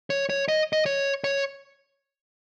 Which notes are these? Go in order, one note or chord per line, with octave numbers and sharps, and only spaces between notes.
C#5
C#5
D#5
D#5
C#5
C#5